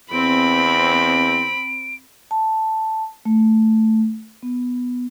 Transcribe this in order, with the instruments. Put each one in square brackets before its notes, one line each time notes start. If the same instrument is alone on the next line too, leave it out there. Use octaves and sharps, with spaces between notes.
[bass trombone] E2 [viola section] C4 [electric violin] B5 [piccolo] D7
[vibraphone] A5
A3
B3